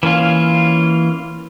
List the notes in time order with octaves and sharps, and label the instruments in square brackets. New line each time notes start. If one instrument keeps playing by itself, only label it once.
[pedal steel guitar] E3 A#3 C#4 F4